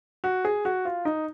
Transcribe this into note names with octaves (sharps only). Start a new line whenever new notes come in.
F#4
G#4
F#4
F4
D#4